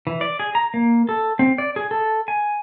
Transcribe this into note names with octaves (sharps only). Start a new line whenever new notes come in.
E3
D5
G#4
A#5
A#3
A4
C4
D5
G#4
A4
G#5